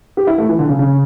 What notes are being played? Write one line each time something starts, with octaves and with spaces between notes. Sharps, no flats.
G4
E4
A3
E3
D3
C#3
C#3